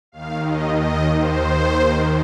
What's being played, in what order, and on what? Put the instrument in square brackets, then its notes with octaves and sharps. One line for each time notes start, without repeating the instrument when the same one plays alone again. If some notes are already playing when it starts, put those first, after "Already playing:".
[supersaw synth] D#2 D#3 F5
D#5
D#5
C5